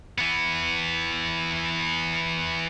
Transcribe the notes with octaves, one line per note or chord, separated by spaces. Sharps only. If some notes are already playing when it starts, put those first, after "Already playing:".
E3 B3